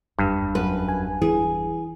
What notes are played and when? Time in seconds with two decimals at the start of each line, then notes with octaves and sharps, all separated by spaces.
0.19 F#1 E2 G2
0.55 F#2 B4
0.88 G#5
1.22 E3 G#4